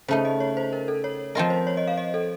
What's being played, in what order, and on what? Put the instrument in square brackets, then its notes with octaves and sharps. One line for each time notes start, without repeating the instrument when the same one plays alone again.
[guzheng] C#3 A3 D#4 [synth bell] C5
[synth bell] D#5
C#5
C5
A#4
A4
C#5
[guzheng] F3 C4 F4 A#4 [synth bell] D#5
[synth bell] C5
C#5
D#5
F5
D#5
A4